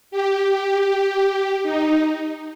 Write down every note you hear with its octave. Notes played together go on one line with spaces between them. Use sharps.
G4
D#4